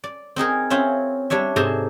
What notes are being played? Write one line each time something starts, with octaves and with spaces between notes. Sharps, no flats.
D5
C4 D#4 G#4 A#4
C4 C#4 F4 E5
G3 D4 C#5 E5
G#2 C3 A4 C5 G#5 A#5